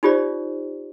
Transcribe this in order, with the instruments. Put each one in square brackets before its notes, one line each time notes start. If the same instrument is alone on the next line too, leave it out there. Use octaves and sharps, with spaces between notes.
[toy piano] D#4 F4 G4 C5 D5